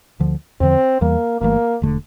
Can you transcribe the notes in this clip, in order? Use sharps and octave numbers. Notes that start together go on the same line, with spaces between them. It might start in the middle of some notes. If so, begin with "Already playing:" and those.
D2 D3 F3
E2 D3 F3 C4
E2 E3 G3 A#3
G1 G2 E3 A3 A#3
E1 D3 A3